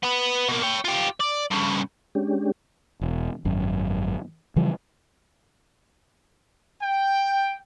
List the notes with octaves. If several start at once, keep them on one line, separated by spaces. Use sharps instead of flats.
B3 B4
B2 A#3
C#5 G5
F4 G4
D5
G2 C#3
G#3 C#4 D4 G4
E1
G#1 F#2
C#3 E3 F3 G3
G5